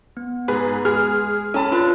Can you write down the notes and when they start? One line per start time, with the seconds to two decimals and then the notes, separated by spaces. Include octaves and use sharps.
0.17 B3
0.48 G#2 G#4 B4
0.85 G#3 G#4 F6
1.54 C#4 A4 A5 B5
1.71 D4 F4 B4